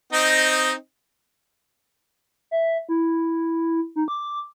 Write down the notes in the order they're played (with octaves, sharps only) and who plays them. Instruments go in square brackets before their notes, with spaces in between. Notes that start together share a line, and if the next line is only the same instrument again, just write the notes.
[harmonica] C4 D#4 D#5
[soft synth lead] E5
E4
D#4
D6